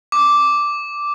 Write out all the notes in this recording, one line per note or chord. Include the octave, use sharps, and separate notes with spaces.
D6